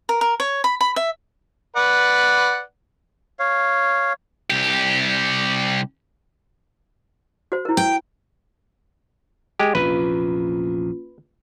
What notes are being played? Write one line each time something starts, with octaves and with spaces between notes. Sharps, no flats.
A#4
A#4
C#5
B5
B5
E5
B4 D5 F#5
C#5 F5
C2 G4
F#4 C5
E4 A#4
G5
G#3 G4
A#1 E2 C3 A#3 C#4 F4 B4